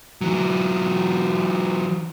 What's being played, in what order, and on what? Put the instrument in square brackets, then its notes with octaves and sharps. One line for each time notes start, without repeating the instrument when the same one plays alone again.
[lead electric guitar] E3 F#3